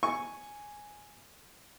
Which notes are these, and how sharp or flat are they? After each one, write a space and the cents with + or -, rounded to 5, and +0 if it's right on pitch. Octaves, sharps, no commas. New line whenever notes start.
G#5 +0 C#6 +0